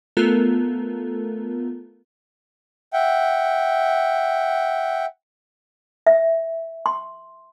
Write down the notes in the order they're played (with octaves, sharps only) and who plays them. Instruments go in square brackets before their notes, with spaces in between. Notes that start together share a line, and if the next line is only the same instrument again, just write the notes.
[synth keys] A3 B3 F4 A4 A#4
[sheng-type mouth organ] E5 F#5 G5
[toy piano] E5
C6